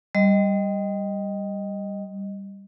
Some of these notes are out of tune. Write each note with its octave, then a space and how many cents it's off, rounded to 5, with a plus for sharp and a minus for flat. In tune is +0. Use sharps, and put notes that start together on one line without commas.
G3 +0 D#5 +0